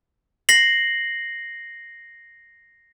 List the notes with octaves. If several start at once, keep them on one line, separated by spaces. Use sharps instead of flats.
A#6 C7 F#7